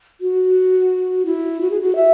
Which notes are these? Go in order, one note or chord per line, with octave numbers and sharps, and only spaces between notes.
F#4
E4
F#4
G#4
F#4
E5